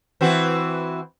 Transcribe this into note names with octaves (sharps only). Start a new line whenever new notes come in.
E3 C4 F#4